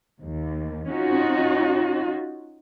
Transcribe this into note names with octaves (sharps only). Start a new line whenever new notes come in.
D#2
C#4 D#4 F4 F#4